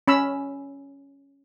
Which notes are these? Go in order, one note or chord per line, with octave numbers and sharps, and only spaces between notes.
C#4 B5 E6